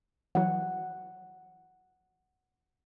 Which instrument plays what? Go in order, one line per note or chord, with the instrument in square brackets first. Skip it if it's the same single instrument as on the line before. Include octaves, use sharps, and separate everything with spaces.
[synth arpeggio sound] E3 F#3 [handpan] F#5